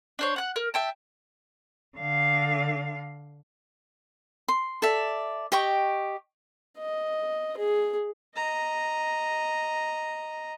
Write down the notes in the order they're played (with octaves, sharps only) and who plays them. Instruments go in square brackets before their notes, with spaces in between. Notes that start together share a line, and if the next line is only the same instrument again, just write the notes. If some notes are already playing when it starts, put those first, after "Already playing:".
[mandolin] D4 C5 C#5
F#5 F#6
A#4
E5 G5 A5
[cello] D3 F5
[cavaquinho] C6
A4 D5 E5
G4 D#5 G5 C#6
[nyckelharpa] D#5
G#4
D#5 A#5